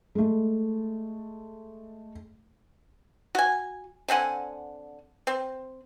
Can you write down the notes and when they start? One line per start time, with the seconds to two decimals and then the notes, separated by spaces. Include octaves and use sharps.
0.15 G#3 A3
3.35 F#4 G#5
4.08 D3 C4 F#5 G#5
5.27 C4